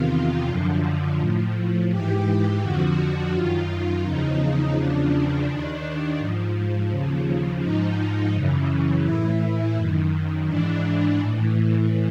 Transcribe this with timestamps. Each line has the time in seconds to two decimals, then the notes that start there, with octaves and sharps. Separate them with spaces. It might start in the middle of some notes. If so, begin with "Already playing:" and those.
Already playing: E2 C3 D#3 F4
0.47 F#2 D3 F3
1.19 A2 F3
1.90 G#2 E3 G4
2.26 G4
2.61 F2 D3 F3 F#4
2.97 F#4
3.33 F#2 D#3 F4
4.04 E2 C#3 F3 D#4
4.75 E2 C#3 F3 D4
5.47 D#2 D#3
6.18 G#2 F3
6.90 D#2 C#3 F3
7.61 G#2 F3 D#4
8.33 F#2 C#3 E3
9.04 A2 E3 E4
9.75 F#2 D#3
10.47 G#2 E3 D4
11.18 A2 E3